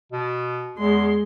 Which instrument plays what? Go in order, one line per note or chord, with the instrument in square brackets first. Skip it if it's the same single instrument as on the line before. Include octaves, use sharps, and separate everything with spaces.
[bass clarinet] B2
[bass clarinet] E2 [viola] G#3 C6